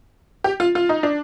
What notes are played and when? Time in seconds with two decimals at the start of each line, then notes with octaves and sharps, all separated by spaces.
0.44 G4
0.60 F4
0.75 F4
0.89 D#4
1.03 D4